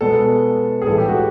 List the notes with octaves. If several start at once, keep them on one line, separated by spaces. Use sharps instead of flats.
B2 G#3 B3 A4
G#4
A2 E3 G#3 A4
G4
F#4